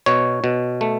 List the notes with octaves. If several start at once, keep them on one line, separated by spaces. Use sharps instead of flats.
B2 C#5
B2
A3